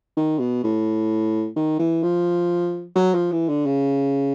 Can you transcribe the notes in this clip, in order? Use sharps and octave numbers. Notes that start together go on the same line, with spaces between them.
D#3
B2
A2
D#3
E3
F3
F#3
F3
E3
D3
C#3